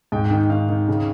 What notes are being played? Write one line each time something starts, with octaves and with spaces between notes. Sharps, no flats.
G#2 G5
G5
D#3
D#3 F5
D#3
C#3